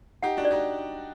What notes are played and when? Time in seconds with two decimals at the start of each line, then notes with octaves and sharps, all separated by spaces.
0.23 D#4 G4 F#5
0.37 D4 F#4
0.45 D5
0.51 D#4 G4